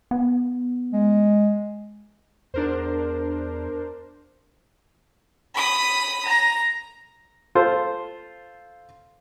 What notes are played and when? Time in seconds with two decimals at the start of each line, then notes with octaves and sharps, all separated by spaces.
0.11 B3
0.93 G#3
2.54 E2 D4 A#4 C5
5.54 B5 D#6
6.25 A#5
7.55 F4 A4 C5